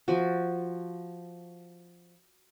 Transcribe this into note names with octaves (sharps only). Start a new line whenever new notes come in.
F3 F#4